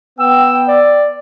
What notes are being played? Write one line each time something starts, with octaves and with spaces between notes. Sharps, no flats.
B3 G5 E6
D5